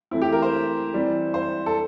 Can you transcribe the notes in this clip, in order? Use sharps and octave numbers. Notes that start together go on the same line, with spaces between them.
E3 A3 C4 E4
G4
A#4
C5
E3 G3 C4
C5
A4